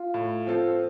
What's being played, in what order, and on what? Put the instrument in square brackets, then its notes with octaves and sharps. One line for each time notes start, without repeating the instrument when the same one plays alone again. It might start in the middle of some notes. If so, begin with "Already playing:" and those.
Already playing: [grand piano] F4
[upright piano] A2
F3 C4 F4 A4